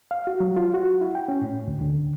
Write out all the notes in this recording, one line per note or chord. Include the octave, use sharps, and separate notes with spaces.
F5
F#4
F#3
F4
F#4
E4
G5
C#4
A2
D2
D3